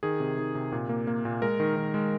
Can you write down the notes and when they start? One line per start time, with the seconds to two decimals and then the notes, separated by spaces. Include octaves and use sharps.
0.03 D#3 G#4
0.20 C3
0.39 D#3
0.55 C3
0.72 A#2
0.89 A#3
1.07 A#3
1.25 A#2
1.42 G#3 A#4
1.60 D#3
1.76 D#3
1.94 G#3